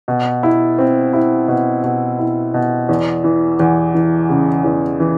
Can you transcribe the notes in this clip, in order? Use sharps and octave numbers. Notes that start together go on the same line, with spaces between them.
B2
E4
C4
E4
B2
B2
E4
B2
E2
E3
E2
E3
C#3
E2
E3